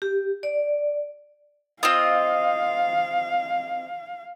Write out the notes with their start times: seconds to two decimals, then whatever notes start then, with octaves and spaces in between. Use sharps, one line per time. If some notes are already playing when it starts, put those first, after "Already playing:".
0.02 G4
0.43 D5
1.83 C4 F4 D#5 F5